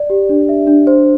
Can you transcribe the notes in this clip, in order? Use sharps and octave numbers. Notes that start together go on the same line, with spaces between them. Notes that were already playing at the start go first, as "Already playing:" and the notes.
Already playing: D5
G4
D4
E5
D4
C5